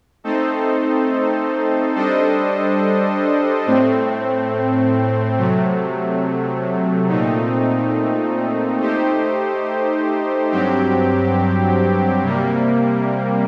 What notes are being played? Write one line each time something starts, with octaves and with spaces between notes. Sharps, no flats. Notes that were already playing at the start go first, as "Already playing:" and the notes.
A3 C4 D#4 A4 C5
G3 D4 A4 C5 D#5
A2 A3 C4
C3 F#3 A3
A#2 A3 C4 D#4
A3 D#4 G4 C5
G2 F#3 C4 G4
C3 G3 A#3